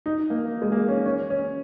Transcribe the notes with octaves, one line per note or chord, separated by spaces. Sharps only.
D#4
A#3
G#3
A#3
C#4
C#4
C#4